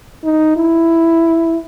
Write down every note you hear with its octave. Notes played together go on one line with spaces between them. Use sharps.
D#4
E4